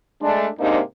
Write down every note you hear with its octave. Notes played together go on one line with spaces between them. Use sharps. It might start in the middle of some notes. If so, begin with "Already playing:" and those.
G#3 A3 D4
G#2 C3 A#3 D4 D#4